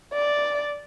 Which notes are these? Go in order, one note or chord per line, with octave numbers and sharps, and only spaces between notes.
D5